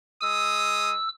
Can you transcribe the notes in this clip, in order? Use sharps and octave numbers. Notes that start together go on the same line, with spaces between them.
G#3 D#6 E6